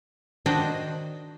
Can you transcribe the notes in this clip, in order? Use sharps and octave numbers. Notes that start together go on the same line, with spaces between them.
D#3 D4 F#4 C5 D#5 G5